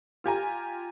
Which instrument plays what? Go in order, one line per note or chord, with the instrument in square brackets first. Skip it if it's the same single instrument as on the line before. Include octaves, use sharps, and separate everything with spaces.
[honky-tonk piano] F4 G4 G#5 A#5